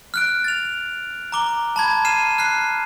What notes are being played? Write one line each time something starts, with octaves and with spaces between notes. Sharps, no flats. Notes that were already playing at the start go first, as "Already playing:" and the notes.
F6 F#6 D7
A6 F7
A#5 D6 G7
A5 B5 G#6
F6 C7 D#7 E7
F6 F#6 C7